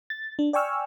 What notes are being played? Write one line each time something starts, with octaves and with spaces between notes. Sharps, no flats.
A6
D4
D5 G5 G#5 C#6 E6 F6